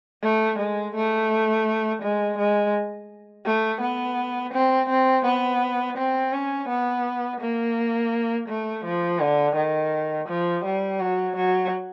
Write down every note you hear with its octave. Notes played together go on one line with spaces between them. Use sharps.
A3
G#3
A3
G#3
G#3
A3
B3
C4
C4
B3
C4
C#4
B3
A#3
A3
F3
D3
D#3
F3
G3
F#3
F#3